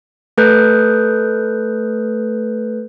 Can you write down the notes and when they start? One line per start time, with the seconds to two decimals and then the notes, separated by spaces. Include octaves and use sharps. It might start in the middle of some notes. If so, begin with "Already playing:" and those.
0.38 A3 A4 B4 F#6 G6